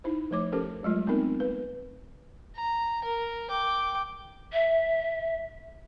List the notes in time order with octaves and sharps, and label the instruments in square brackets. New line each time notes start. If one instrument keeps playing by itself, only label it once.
[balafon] D#4 E4 C5
F3 A3 C#5 D6
C#4 G4 A4 A#4 C5
F#3 G#3 A3 F4
B3 C4 D#4 A#4
B4
[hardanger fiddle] A#5
A#4
G5 D6
[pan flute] E5